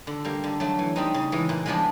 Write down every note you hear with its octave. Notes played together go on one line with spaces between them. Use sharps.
D3
G3 A#3
D3
F#3 A3 D4
E3
G3 C4 D#4
C#3
E3 G#3
A#2
F3 G#3 B3 D4